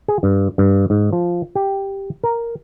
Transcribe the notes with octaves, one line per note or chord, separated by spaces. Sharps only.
G#4
G2
G2
G#2
F3
G4
A#4